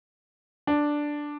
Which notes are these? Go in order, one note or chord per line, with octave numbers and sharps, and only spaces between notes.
D4